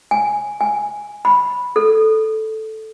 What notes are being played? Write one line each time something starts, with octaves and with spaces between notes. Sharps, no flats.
G#5
G#5
B5
A4